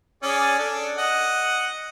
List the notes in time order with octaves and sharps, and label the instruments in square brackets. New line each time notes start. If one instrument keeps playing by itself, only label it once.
[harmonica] C#4 G#4 D5
D4 A4
D#5 F#5